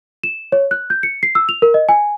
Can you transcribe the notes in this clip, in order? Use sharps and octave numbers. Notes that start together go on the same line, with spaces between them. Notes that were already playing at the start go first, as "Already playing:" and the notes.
E7
C#5
F#6
G6
C#7
C7
E6
F7
A#4
D#5
G#5